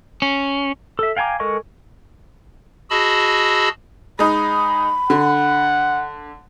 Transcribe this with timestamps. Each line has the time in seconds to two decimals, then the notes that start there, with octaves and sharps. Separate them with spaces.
0.22 C#4
0.99 A4 E5
1.17 F5 G5 G#5 A#5 D6
1.40 G#3 A4 A#4 D#5 C#6
2.90 F#4 G#4 D#5 A5 B5 E6
4.19 G#3 D#4 B5
5.10 D3 F#5